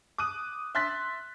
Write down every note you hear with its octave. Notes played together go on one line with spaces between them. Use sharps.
D6 D#6 F#6 D#7
E5 C6 F#6 A6 B6